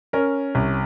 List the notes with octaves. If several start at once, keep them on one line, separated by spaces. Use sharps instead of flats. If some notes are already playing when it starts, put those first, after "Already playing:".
C#4 A#4
C2